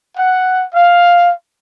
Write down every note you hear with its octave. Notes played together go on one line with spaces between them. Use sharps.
F#5
F5